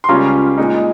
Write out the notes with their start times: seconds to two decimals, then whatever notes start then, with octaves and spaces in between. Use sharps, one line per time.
0.04 C6
0.08 C#2 C#3 G3 C#4 F4 A#5
0.58 A#2 G#3 D#4